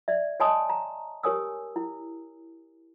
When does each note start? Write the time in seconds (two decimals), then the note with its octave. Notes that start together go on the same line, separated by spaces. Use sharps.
0.08 D5 E5
0.40 C#5 D#5 G#5 A5 C6 D#6
0.69 A#5
1.23 G4 A#4 C#5 G#5 D#6 E6
1.76 E4